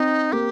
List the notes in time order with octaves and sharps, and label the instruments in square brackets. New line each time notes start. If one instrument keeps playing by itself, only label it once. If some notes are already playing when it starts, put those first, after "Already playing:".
Already playing: [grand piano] C4 [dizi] D#4
[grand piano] A#3 [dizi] G4